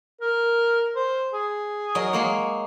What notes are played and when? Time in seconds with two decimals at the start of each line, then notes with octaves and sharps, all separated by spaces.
0.21 A#4
0.96 C5
1.33 G#4
1.95 F#3 A#4 D#5
2.13 G#3 A#3 C#5